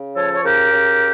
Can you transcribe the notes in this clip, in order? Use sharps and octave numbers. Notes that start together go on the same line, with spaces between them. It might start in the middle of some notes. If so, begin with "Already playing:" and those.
Already playing: C#3
F3 A4 C#5
C#5
C#3 G4 A#4
C#3